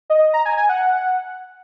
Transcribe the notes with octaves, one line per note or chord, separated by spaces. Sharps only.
D#5
A#5
G#5
G#5
F#5